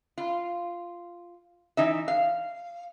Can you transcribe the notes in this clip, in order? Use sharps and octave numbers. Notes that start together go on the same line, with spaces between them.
F4
E3 D#4 E5
F5